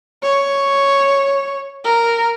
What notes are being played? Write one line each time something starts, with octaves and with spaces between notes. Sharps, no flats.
C#5
A#4